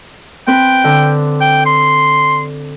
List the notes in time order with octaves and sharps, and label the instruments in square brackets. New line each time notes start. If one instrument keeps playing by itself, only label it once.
[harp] C4 B4 [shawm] G5
[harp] D3
[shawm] G5
C6